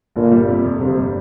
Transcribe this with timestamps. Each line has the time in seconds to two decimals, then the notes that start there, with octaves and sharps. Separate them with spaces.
0.16 G1 A#2
0.32 G3
0.49 C3
0.64 F2
0.80 G1 C3
0.97 G3